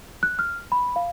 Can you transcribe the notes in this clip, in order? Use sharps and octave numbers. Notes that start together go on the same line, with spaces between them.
F#6
F6
B5
F5